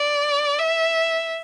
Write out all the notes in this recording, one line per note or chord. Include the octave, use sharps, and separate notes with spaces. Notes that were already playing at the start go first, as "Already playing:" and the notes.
Already playing: D5
E5